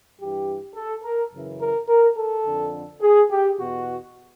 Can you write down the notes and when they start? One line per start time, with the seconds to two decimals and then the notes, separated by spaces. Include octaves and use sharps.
0.18 G2 E3 G4
0.75 A4
1.04 A#4
1.32 F#2 C#3 E3
1.60 A#4
1.88 A#4
2.17 A4
2.45 F2 D3
3.02 G#4
3.30 G4
3.58 E2 B2 F#4